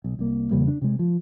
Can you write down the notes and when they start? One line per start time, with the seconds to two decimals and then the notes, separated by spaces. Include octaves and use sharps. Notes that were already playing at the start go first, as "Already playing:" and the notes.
0.04 B1
0.19 C2 A#3
0.51 E2 C#3 G3 A#3
0.68 D4
0.82 C3 G#3
0.99 F3